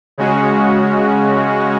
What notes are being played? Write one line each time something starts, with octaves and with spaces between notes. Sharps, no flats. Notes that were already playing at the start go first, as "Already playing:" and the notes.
C#3 G#3 C#4 F#4